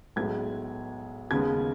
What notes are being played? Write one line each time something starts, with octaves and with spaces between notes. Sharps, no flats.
B1 A2 G#3 B3 G#6
D#2 C#3 G#3 B3 G#6